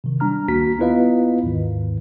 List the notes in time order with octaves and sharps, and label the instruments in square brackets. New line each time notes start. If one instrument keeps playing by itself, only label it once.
[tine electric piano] C3 D#3
G3 D4 A#5 F6
D2 D#3 A#3 F#4 A#5 B6
B3 E4 F4 B4 D#5 F5
D#2 G#2 D#3